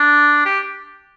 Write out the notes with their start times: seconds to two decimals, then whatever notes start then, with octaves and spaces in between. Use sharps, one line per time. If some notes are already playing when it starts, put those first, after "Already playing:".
Already playing: D4
0.46 G4